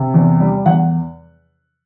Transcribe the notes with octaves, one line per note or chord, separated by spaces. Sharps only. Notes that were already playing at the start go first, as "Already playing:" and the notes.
Already playing: C3
E2
G3
E2 F#5